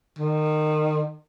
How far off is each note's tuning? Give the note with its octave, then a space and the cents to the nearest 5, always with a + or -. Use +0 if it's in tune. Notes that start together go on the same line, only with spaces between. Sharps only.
D#3 -25